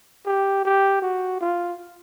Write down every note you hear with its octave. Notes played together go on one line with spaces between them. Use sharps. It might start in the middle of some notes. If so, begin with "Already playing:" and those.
G4
G4
F#4
F4